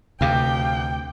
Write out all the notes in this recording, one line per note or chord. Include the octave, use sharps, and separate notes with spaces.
F1 D2 C3 F5 G5 D6